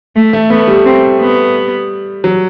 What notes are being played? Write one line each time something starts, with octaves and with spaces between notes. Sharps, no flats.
A3
A3
A3 B3
G3
C4
B3
F#3